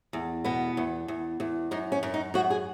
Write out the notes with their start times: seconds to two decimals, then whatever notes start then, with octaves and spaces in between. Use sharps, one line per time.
0.13 E2
0.44 B2 B3
0.77 E2
1.08 E2
1.40 E2
1.71 F#2 D#4
1.92 C#4
2.03 F#2
2.14 D#4
2.34 F#2 F#4
2.50 G#4